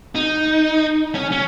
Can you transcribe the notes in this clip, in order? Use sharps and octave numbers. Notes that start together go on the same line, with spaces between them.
D#4
C#4
C#4